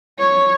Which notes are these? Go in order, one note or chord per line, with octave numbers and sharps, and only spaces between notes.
C#5